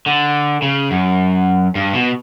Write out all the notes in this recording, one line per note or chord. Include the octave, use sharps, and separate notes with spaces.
D3
C#3
F#2
G2
B2